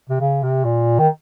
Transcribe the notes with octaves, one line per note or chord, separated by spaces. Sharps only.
C3
C#3
C3
A#2
D#3